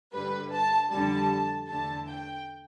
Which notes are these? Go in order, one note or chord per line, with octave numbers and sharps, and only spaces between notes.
G2 D3 G3 B4
A5
F2 D3 G3 A5
E2 D3 A3 A5
G5